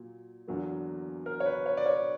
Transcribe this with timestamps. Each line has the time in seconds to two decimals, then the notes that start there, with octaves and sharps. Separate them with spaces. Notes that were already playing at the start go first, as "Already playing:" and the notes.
Already playing: A#2 F#3
0.47 E2 D3 F#3 A#3
1.26 A#4
1.40 C#5
1.46 B4
1.66 C#5
1.77 D5
1.86 C#5